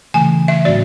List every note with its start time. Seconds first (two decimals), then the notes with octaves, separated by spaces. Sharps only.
0.14 C#3 E3 A3 G#5
0.48 E5
0.65 A2 F#3 C#4 F#4 D5